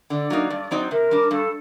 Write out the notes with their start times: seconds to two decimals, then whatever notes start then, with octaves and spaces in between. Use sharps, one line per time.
0.10 D3 D5
0.30 F#3 A#3 D#4
0.50 G2
0.71 F#3 C4 D#4
0.91 C3 A#4
1.11 G3 D4
1.31 G2 A4